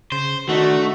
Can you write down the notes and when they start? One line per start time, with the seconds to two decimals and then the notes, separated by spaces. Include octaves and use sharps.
0.12 C#3 C5
0.49 D#3 A3 D4 D#4 F#4